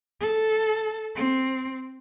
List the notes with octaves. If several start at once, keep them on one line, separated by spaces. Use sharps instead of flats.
A4
C4